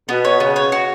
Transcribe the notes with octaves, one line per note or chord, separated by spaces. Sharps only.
B2 B3
C#5
C#3 B3
C#5
F#4